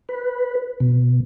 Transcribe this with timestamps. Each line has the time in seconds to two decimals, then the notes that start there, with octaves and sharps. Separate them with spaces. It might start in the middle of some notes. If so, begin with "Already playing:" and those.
0.09 B4
0.80 B2